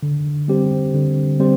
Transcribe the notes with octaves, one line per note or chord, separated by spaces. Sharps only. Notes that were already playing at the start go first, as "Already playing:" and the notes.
D3
G3 C4 G4 C5
D3
G3 C4 G4 C5